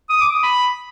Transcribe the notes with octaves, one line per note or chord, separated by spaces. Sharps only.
D#6
D6
D#6
B5